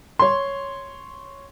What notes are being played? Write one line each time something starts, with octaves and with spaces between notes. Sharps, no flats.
C#5 C6